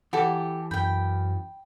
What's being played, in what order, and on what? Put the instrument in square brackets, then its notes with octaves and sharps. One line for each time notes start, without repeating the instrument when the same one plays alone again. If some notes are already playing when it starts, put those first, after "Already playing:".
[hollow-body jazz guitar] E3 [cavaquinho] G4 A4 [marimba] F#5
[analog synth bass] F#2 [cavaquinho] G5 B5 [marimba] G6